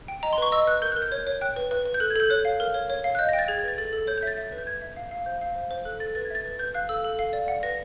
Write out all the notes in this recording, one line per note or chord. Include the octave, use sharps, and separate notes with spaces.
G5
D#5 A#5
C6
B4 C#6
D#5 E6
B4 F#6
A#4 G6
F#6
A#4
G6
C#5
C#5
G5 F#6
B4
B4
B4
G6
A4 F#6
G#6
A4 G6
C#5 F#6
F5
A#4
C#5
C#5
F5
F#6
D#5 G6
A#6
G5
A6
G#4 G#6
G#6
B4 A6
A4 A6
A4
C#5 G6
G6
E5 A6
E5
B4
G6
B4 G#6
E5
F5
F5
C5 G6
F5
C5
C5
A4 F#6
A4 A6
B4 A6
G#6
E5 A6
B4
B4 G6
F5 F#6
A4 E6
A4
F5
D5
F#5
B4 A#6